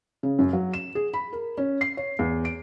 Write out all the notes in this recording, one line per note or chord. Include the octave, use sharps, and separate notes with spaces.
C#3
F#2
F#3
E7
G#4
B5
A#4
C#4
C7
C#5
E2
D7